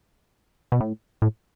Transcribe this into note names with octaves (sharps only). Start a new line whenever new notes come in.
B2
A2
A2